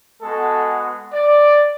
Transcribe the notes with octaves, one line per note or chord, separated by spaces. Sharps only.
G#3 B3 F#4 A4
D5